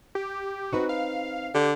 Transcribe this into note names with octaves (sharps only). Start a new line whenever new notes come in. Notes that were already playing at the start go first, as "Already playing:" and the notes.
G4
C4 D#4 F#4 B4
F5
D3 G4